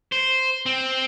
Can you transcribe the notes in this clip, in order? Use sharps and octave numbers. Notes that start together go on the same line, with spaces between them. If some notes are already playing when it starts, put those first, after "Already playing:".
C5
C4